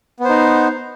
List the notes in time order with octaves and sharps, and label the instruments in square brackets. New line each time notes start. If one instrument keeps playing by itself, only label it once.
[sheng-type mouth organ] B3
C5
D#4